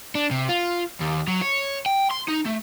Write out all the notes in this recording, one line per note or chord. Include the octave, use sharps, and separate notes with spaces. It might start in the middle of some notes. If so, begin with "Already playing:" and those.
D4
C3
F4
D#2
F#3
C#5
G5
C6
D#4
A3